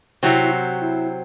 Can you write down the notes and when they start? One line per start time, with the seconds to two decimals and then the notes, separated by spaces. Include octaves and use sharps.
0.23 C3 F#3 C4 E4
0.42 E4
0.52 F#4
0.81 E4